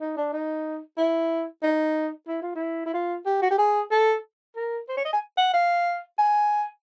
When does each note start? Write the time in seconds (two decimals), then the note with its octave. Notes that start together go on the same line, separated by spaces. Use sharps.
0.01 D#4
0.17 D4
0.33 D#4
0.98 E4
1.63 D#4
2.28 E4
2.42 F4
2.55 E4
2.86 E4
2.94 F4
3.26 G4
3.42 F#4
3.50 G4
3.58 G#4
3.91 A4
4.56 A#4
4.89 C5
4.97 C#5
5.05 D#5
5.13 G#5
5.37 F#5
5.54 F5
6.19 G#5